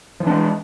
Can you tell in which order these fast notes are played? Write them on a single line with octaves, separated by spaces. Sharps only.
F3 E3 D4 G#3